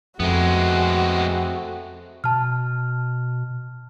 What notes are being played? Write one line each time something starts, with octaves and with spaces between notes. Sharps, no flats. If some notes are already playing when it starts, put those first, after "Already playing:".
F2 G#3 A3 B3 C4 F#4
B2 A5 F6